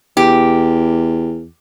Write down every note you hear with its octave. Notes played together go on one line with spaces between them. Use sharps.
E2 G4